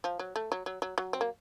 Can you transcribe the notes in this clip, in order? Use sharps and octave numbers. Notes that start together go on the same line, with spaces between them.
F3
F#3
A3
F#3
F#3
F#3
F#3
C4
A#3